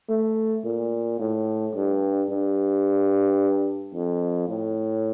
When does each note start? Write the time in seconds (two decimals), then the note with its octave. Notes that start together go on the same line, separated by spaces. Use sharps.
0.09 A3
0.65 A#2
1.19 A2
1.75 G2
2.30 G2
3.95 F2
4.48 A2